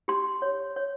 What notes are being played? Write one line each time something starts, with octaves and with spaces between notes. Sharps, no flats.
G4 C6
C#5
C#5